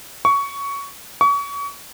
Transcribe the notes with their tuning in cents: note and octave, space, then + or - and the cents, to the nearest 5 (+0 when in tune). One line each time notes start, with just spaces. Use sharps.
C#6 +15
C#6 +35